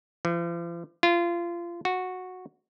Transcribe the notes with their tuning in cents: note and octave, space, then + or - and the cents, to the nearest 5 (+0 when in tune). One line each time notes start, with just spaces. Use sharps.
F3 -45
F4 -25
F#4 -10